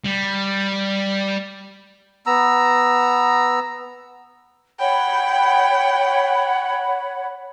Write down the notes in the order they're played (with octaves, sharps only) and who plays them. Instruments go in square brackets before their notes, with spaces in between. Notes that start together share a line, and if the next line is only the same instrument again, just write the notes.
[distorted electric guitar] G3
[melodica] B3 A#5 E6
[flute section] C#5 F#5 B5 [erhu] G5